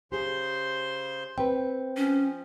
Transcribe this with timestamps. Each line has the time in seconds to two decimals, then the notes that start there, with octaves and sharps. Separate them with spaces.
0.12 C#3 G4 G#4 C5 C6
1.38 C4 B4 G5
1.97 F3 C#4